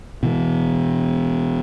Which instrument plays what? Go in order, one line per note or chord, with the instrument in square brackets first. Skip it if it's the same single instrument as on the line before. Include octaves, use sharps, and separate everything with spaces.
[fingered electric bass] B2 E3